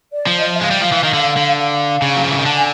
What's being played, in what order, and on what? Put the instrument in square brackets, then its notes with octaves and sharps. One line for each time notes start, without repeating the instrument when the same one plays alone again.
[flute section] D5
[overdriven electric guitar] F3
[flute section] D#5
E5
[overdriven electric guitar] G#3 [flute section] F5
[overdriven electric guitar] G3
F3
E3
D#3
D3
D3
[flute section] F5
[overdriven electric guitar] C#3
F#3
F3
E3
D#3
[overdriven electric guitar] D3 [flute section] A5
[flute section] G#5